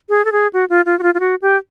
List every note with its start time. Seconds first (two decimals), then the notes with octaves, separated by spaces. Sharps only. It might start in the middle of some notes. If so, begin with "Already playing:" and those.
0.09 G#4
0.25 A4
0.32 G#4
0.53 F#4
0.70 F4
0.86 F4
0.99 F#4
1.03 F4
1.14 F4
1.20 F#4
1.42 G4